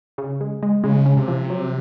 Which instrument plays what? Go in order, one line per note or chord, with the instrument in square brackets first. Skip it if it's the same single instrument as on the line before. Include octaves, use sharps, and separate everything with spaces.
[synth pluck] C#3
G#3
G#3
[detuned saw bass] C#3 [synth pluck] G#3
[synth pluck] C#4
[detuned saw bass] C3
[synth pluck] F3
F#3